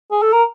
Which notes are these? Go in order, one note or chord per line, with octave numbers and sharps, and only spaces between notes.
G#4
A4
A#4